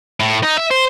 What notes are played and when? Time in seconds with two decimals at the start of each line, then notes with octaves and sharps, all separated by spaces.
0.20 A2
0.43 D#4
0.57 E5
0.71 C5